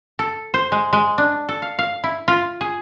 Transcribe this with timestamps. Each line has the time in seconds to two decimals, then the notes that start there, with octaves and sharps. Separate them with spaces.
0.19 A4
0.54 C5
0.72 G#3
0.93 G#3
1.18 D4
1.49 A4
1.62 F5
1.79 F5
2.04 E4
2.28 F4
2.61 G#4